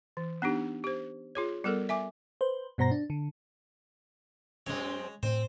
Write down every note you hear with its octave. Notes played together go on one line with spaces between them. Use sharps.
E3
B3 D4 D#4 G4
G4 C5
F4 G#4 C#5
G3 B3 A4 A#4
E5 G#5 D6
B4 C5
G2 B2 C5 A#5 A#6
D4
D3
F#2 G#3 C4 C#5
A2 C4 C5